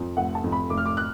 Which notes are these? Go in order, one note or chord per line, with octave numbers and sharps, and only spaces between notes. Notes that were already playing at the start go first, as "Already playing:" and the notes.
Already playing: F2 F3
F1 F#5
A5
F2
B5
F1 D6
F6
D6
F#6